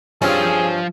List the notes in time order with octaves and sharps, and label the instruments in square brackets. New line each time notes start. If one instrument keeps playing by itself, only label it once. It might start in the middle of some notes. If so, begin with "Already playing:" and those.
[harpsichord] G2 C4 [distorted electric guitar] F3 F5 [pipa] C#4 [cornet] G#4